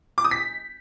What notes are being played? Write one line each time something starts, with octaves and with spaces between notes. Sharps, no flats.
D6
D#6
B6